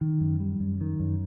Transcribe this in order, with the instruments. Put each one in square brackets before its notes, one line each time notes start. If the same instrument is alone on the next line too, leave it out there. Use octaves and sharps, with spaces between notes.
[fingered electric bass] D#3
F#2
G3
F#2
D#3
F#2